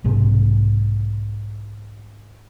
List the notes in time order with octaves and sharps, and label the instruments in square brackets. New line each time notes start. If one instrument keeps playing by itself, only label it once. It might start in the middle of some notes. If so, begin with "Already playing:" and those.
[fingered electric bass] B1 G#2 C3